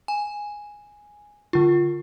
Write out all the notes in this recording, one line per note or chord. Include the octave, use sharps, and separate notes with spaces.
G#5
D3 F4